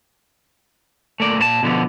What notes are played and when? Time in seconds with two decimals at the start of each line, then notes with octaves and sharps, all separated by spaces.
1.20 A3 A#3 D5
1.39 A#2 C5 A5
1.63 B2 D3 F3 B3